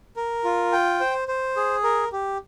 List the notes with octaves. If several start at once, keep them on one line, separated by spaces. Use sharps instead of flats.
A#4
F4
G5
C5
C5
G#4
A#4
G4